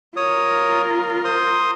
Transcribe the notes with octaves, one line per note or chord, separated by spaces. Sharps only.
F4 A#4 C#5 D#6
C5 C6 D#6